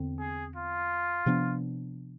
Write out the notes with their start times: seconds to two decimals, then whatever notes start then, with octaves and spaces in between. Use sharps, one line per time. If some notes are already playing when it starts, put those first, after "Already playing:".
Already playing: E2 D3 C4
0.20 G#4
0.56 F4
1.26 C3 F3 B3 D4